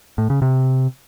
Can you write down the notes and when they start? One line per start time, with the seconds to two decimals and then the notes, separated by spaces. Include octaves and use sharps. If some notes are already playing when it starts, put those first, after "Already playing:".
0.18 A2
0.30 C#3
0.42 C3